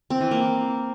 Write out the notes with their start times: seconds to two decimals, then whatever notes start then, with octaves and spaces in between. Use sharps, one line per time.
0.10 C4
0.21 E3
0.31 A#3